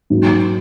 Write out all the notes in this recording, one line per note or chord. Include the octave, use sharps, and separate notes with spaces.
G#2 F#3 A#3